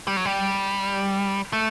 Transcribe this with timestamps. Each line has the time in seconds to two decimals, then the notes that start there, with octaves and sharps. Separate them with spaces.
0.07 G3
0.17 F#3
0.25 G3
1.53 A3